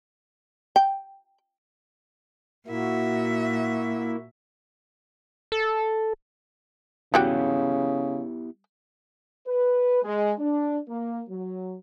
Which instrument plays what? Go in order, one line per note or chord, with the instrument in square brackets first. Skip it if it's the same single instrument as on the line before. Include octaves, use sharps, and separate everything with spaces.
[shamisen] G5
[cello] A#2 E5 [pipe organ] A#3 E4 [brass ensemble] F#4
[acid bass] A4
[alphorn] C#3 [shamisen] G3 F#4 G5 [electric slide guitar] B3 E4 G4
[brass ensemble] B4
G#3
D4
A#3
F#3